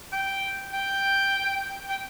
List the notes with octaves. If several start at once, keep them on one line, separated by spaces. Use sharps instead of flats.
G5
G5
G5